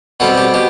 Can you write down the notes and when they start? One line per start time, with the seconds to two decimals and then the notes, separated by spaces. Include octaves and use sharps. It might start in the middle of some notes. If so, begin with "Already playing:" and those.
0.20 B2 G3 C4 A4
0.38 G4
0.54 B2 G4